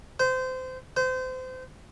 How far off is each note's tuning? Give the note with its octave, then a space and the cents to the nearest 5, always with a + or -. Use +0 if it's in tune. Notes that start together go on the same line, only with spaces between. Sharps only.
C5 -25
C5 -30